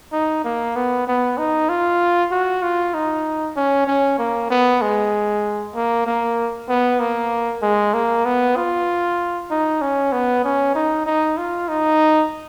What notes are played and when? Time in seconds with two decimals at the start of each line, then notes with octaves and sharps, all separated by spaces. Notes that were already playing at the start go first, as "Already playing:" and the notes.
0.12 D#4
0.44 A#3
0.76 B3
1.07 B3
1.38 D#4
1.69 F4
2.31 F#4
2.63 F4
2.94 D#4
3.56 C#4
3.87 C#4
4.18 A#3
4.50 B3
4.81 G#3
5.75 A#3
6.07 A#3
6.69 B3
7.00 A#3
7.62 G#3
7.94 A#3
8.25 B3
8.56 F4
9.50 D#4
9.81 C#4
10.12 B3
10.44 C#4
10.75 D#4
11.06 D#4
11.38 F4
11.68 D#4